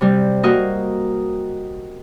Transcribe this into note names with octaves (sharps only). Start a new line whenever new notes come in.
C3 G3
A#3 F#4 A#4 D#5